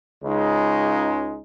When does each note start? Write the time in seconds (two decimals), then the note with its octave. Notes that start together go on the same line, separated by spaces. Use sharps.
0.23 C#2 C#3 G#3 D#4